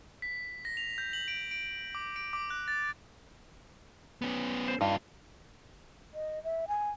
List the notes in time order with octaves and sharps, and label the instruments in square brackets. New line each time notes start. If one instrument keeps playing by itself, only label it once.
[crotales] B6
A#6
F7
G6
F#7
D7
D7
D6
D7
D6
F#6
A6
[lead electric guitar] B3 C#4
[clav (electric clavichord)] C5
[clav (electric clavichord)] G2 [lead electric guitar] D#4 F4
[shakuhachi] D#5
E5
G#5